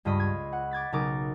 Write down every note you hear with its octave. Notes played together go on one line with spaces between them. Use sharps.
C#2 G2 F4 D#5 B5
G#6
F#5
D6 G#6 A6 B6
B1 C#3 D#4 A#4 D6 A6